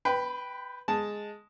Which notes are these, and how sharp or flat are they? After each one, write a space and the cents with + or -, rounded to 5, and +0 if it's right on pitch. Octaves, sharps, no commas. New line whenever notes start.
B4 +0 G5 +0 B5 +45
G#3 +0 A5 +0